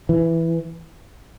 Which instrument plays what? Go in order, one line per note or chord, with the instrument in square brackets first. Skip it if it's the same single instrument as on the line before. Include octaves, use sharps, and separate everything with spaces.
[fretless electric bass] E3